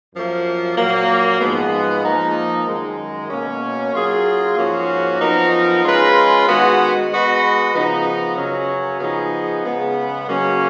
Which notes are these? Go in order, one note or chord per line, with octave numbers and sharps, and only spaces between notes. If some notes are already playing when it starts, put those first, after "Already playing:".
F#2 F3 A#3
A#2 F#3 A#3
G#2 F3 G#3 B3
F3 A#3 D#4
F#2 D#3 G#3
B2 A#3 C#4
F#3 A#3 F4 G#4
G#2 F3 A#3 C#4 F#4
F#2 F3 B3 D#4 A#4
G#3 C#4 F4 B4
D#3 G#3 B3 F#4
G#3 B3 F#4 B4 D#5
C#3 F3 B3 D#4
F#2 C#3 F#3 C#4
C#3 F3 B3 D#4 G#4
C#3 G#3 B3
C#3 F#3 A#3 C#4